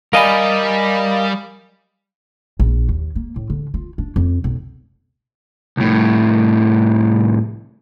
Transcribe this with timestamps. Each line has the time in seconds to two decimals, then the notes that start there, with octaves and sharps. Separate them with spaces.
0.13 G3 A#4 D5 D#5 F5 G#5 B5
2.60 A#1
2.89 D#2
3.15 A#3
3.36 A2
3.50 D3
3.74 F4
3.98 D4
4.16 F2
4.44 B1
5.77 C2 A2